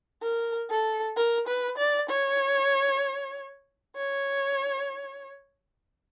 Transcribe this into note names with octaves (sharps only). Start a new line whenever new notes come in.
A#4
A4
A#4
B4
D5
C#5
C#5